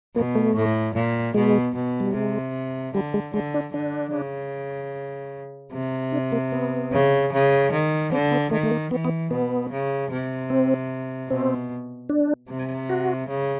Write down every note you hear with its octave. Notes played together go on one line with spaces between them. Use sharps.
B2 A#3
A3
A2
A#2
B2 G#3
B2
G3
C3 G#3
D3 G3
G#3
D3 G#3
D4
D3 D4
C#3
C3
D4
A#3
B3
C#3
C#3
D#3
D3 C4
B3
D#3 A3
A3
A#3
E3 B3
B3
B2 B3
C#3
C3
C4
B2 C4
D4
C3
F#4
C#3